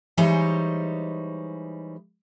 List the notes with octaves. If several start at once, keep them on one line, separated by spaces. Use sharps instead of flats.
E3 G3 G#3 D#4 C5 C#5